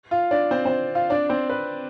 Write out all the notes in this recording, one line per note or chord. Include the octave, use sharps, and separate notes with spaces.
F4 F5
D4 D5
C4 C5
C4 C5
F4 F5
D4 D5
C4 C5
B4